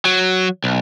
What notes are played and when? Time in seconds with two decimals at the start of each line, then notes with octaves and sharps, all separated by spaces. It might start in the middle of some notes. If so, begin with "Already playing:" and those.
0.05 F#3
0.64 B1